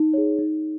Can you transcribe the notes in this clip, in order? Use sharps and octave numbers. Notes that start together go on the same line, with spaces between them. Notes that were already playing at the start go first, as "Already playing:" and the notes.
Already playing: D#4
G#4 C#5
D#4